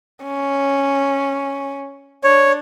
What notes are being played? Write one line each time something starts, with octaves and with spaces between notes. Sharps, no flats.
C#4
D4 C#5